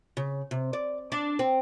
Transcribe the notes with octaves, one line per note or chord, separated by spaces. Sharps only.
C#3
C3
D5
D4
C4